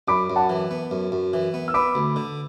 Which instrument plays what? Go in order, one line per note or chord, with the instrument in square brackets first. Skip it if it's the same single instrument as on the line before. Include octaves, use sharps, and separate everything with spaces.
[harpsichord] F#2 [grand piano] B5 D6
[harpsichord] F#2
[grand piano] F#5 A5
[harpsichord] E3
B3
F#2
F#2
E3
B3
[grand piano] E6
[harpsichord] B3 [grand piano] B5 D6
[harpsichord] D2
D3